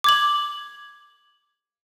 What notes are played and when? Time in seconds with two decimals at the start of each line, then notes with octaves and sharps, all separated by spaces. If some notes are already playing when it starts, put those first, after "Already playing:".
0.04 D6 G#6 F#7